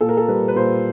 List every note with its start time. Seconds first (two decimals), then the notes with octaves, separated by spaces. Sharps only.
0.01 A#2 A4
0.09 A#4
0.17 A4
0.28 G3 B4
0.48 B4
0.56 A#2 C5